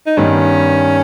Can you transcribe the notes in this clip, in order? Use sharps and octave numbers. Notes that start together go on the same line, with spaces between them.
D#4
G2 D#3 G3 B3 C#4